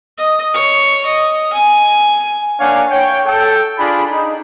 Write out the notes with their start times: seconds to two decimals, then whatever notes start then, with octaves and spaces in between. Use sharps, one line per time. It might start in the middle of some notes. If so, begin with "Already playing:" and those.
0.18 D#5
0.54 C#5
1.06 D#5
1.53 G#5
2.60 A#3 D4 C#5 F5 F#5 G#5
2.91 C#5 G5
3.27 A4 G5
3.79 D4 F4 G#4 B5
4.10 D#4